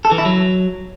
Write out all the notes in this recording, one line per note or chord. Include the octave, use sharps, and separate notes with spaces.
A4
E3
E4
F#3